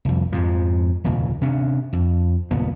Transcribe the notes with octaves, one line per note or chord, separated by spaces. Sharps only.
C2 F2
F2 G#2 F3
F1 D#2 A#2 C#3
C3 C#4 D4
F2
F#1 D#2 A#2 B3